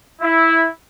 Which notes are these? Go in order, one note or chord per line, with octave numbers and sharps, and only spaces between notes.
E4